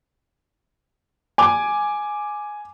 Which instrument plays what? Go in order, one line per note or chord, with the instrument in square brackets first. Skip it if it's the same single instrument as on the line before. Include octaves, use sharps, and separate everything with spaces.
[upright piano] G#5 D6